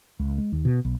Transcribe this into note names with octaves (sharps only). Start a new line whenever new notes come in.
C#2
G#3
D#2
B2
B1